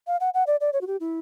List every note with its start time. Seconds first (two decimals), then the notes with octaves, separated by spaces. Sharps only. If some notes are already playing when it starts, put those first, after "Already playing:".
0.07 F5
0.20 F#5
0.34 F#5
0.47 D5
0.61 D5
0.73 C#5
0.81 F#4
0.87 G4
1.00 E4